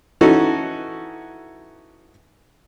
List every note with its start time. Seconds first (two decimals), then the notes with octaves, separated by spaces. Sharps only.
0.21 E3 C#4 D#4 F#4 A4